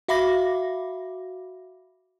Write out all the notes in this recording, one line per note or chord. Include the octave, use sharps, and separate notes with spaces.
F#4 E5 F5 B5 D6 A#6